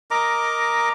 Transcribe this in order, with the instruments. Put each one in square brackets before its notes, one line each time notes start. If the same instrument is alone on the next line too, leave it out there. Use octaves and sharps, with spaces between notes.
[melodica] A#4 D#5 A#5 D6